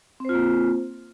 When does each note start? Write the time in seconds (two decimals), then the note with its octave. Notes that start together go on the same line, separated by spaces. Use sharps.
0.20 C4
0.25 C5
0.29 F4
0.34 A#3